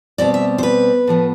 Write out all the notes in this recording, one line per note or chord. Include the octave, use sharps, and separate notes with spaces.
B2 G3 C4 D5
E5
C5
B4
A2 F3 B3